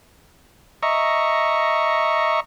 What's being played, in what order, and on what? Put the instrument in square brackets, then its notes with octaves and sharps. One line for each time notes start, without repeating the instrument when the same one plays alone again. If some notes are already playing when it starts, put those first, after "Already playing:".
[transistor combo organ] D#5 E5 A#5 C#6